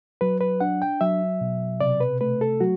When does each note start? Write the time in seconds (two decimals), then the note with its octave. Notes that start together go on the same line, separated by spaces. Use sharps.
0.21 F#3 B4
0.40 B4
0.60 D4 F#5
0.82 G5
1.01 F#3 E5
1.41 B2
1.81 C3 D5
2.00 B4
2.21 A3 B4
2.41 A4
2.60 F#3 F#4